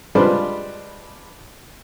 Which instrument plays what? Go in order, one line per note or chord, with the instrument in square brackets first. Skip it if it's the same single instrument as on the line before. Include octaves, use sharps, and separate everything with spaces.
[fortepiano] G3 G#3 D4 F4 B4 C5